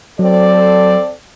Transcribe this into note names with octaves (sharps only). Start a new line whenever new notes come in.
F#3 C4 A4 D5